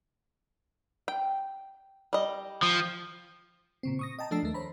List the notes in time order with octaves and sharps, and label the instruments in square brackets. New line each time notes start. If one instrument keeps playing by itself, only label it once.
[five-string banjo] G5
G3 D#5
[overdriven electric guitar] F3
[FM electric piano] A#2 C#3 C4
C#6 D#6 A#6
D#5 G5 A5 A#5
F3 A3 D4 A5 E6 C7
D#2 A3 A#4
C5 C#5 A#5 B5